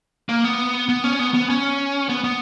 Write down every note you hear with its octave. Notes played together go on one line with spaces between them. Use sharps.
A#3
B3
B3
C#4
B3
B3
C#4
B3
B3